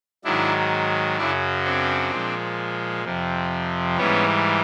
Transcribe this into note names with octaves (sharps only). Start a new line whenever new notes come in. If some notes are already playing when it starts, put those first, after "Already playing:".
G#2 D#3 F#3 D4 E4
F#2 C#3 F#3 D4 E4
C4 D4
A#2 F3 G#3
F2 C3 F3
G#2 E3 G3 B3 C#4